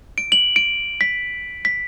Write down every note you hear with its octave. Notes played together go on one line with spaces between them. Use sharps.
D7
F#7
D7
B6
B6